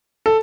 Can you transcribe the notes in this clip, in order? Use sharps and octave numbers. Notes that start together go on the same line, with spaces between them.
A4